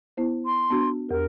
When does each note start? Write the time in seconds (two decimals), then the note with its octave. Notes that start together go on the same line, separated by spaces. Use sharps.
0.17 B3 E4 C5
0.45 C6
0.71 B3 D4 F#4
1.09 E2 G4 A#4